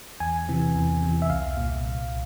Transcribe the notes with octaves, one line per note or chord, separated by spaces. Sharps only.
E2 G#5
C3 E3
E2
C3 E3
E5
C2 F5
A#2
C2